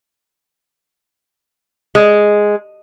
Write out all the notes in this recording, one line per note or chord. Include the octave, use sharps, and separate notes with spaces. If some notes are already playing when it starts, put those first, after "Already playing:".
G#3